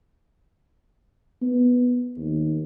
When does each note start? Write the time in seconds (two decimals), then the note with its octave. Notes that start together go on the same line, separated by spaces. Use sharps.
1.42 B3
2.18 D#2